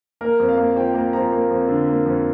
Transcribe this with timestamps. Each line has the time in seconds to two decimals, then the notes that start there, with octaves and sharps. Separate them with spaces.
0.21 A#3 A#4
0.39 F2
0.48 F5
0.57 A#3
0.76 F3 G5
0.94 A#3 A#5
1.13 F3 A#5
1.32 A#3
1.50 F2
1.68 D3
1.88 A#3
2.06 F2